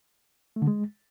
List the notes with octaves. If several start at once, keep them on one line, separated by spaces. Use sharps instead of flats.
A3
D3
G#3